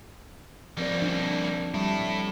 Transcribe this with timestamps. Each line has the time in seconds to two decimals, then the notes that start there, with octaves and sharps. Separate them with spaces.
0.78 F3 G3 A#3 C4 D5
1.01 C#4 D4
1.74 G3 E4 A4